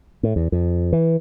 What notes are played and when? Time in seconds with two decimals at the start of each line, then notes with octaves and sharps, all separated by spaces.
0.23 A2
0.36 E2
0.52 F2
0.93 E3